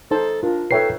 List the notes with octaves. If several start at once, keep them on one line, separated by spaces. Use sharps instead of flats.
D#4 A4 C5 A5
D4 F4 A#4
D#4 A4 B4 C#5 E5 G5 C7